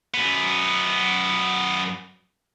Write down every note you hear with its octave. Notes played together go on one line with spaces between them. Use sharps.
F#2 B3